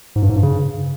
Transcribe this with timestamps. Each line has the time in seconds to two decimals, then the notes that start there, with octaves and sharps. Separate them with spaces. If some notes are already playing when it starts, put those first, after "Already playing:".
0.16 G#2
0.23 G2
0.29 G#2
0.36 G2
0.43 C#3